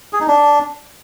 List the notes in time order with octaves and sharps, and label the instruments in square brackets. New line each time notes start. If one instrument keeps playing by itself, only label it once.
[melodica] G#4
D#4
D4